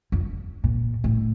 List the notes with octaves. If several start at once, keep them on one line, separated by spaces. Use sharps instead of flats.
F2
A#2
A2